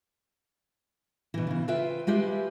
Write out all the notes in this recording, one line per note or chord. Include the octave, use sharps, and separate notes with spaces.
B2 E3
C#3 E3
F4 B4 C5 E5 G5
G#3 F4 G4 B4 E5